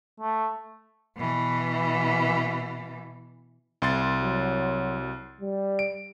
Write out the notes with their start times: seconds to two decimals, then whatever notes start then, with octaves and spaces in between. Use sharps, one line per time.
0.20 A3
1.17 B2 E3
3.82 C2 C6 A6
4.22 F#3
5.41 G3
5.79 D7